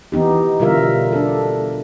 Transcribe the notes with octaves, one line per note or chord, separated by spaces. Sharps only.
E3 B3 D#4 G4
B2 D3 G3 F4 A#4 E5
D4 A4